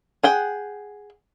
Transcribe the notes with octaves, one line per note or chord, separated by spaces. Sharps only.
G#4 F#5 G5